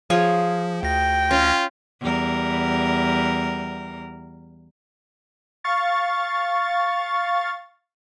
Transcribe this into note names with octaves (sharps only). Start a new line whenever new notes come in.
F3 F4 G#4 C#5
D2 G5 A#6
C#4 F4
E2 G3 A#4
F5 C#6 A6